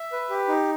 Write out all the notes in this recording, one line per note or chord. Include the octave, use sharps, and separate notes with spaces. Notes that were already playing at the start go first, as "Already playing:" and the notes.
Already playing: E5
B4
G4
D#4